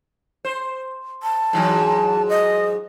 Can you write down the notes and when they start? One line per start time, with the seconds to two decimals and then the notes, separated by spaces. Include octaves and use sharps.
0.45 C5
1.23 A5
1.53 G#2 E3 F#3
2.29 D#5